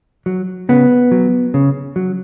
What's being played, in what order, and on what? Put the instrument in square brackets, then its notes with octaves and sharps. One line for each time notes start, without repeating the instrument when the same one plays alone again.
[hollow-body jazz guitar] F#3
C#3 B3
F#3
C#3
F#3